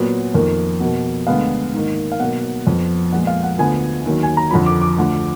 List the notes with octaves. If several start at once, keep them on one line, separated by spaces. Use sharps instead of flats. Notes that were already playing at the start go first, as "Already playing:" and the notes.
Already playing: A#2 F#3 B3
F2 D#3 A#3
B2 A#3
D2 D3 G#3 B3 F5
G#2 D#3 A#3
F5
B2 F#3 A#3 F#5
F2 F3 B3
A#2 F3 G#3 B3 F#5
F5
F#5
D2 D3 F3 B3 G#5
D#2 D#3 F#3
G#5
A#5
F2 D3 F3 B5
D6
D6
D2 D3 F3